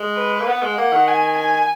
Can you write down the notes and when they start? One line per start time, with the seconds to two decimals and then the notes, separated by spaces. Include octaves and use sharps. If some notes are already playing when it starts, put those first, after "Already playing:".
Already playing: G#3
0.17 B4
0.41 A#3
0.47 B3 F#5
0.63 G#3
0.77 A#3 F#5
0.93 D#3
1.08 G#5
1.38 G#5